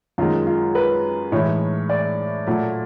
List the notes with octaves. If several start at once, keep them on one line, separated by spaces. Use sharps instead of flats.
F#2 D#3 G#3 F4
F4
B4
A2 E3 G#3 C#5
D5
A#2 F#3 A3